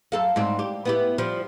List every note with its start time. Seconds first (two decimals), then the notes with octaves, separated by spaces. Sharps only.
0.12 F#2 A4 F5
0.36 G#2 G3 C4
0.59 G4
0.85 B3 E4 G4
1.18 F3 G3